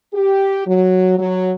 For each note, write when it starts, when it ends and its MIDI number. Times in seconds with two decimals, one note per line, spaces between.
0.14 0.64 67
0.67 1.15 54
1.18 1.52 54